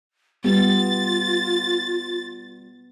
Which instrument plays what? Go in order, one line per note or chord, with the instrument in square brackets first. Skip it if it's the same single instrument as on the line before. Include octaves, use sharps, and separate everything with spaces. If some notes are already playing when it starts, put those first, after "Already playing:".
[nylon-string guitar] G3 [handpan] B3 [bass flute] F4 [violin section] A6